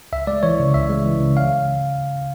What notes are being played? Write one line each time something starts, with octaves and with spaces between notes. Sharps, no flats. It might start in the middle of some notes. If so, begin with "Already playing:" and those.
C#2 E5
G#3 D5
E3 C#5
C#3
C#2 E5
G#3
E3
C#3
F5